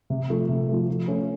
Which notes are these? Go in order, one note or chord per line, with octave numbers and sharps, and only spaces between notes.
C3
F3 A3
C3
F3 A3
F3
A3 C#4